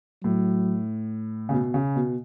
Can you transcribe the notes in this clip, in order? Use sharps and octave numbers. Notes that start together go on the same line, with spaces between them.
A2 F#3
C#3
B2
C#3
B2